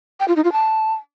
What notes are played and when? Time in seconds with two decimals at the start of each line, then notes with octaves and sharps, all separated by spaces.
0.20 G5
0.28 F4
0.36 D#4
0.44 F4
0.52 A5